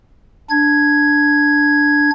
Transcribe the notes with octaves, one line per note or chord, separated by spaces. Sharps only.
D4 G#6